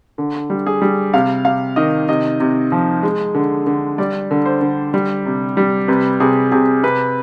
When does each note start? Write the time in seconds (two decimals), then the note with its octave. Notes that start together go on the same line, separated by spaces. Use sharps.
0.18 D3
0.50 G3
0.67 G#4
0.82 G3
1.14 C3 F5
1.45 C3 F5
1.76 D#3 D#5
2.08 C3 D#5
2.40 C3
2.72 F3
3.03 G#3
3.35 D3
3.67 D3
3.98 G3 D5
4.31 D3
4.46 C5
4.61 D3
4.94 G3
5.26 C3
5.57 G3
5.88 C3 B4
6.20 C3 G#4
6.52 C3 G#4
6.83 C3 B4